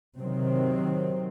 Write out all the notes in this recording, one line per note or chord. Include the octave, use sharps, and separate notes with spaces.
C3 D#3 F#3 C4